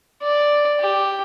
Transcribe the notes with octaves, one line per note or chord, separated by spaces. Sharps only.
D5
G4